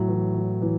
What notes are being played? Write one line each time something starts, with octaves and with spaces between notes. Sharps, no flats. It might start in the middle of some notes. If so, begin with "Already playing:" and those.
Already playing: A2 F#3
E3
E3
A2 E3